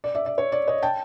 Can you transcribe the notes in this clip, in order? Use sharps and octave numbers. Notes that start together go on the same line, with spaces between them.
D5
D5 E5
D5
C#5
D5
C#5 D#5
G5 A5